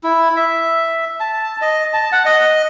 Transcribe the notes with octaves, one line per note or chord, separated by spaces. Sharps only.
E4
E5
A5
D#5
A5
F#5
D#5